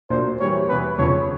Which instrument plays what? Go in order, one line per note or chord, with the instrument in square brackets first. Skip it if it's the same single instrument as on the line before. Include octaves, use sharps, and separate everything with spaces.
[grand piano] A#2 F#3 A#3 D4 [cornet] C5
[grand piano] E3 G3 A#3 [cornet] C#5
[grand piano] E2 C3 E3 [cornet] B4
[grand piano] F2 C#3 F3 [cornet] C#5